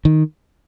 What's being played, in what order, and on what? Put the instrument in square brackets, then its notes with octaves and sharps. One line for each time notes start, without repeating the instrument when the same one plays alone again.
[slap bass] D#3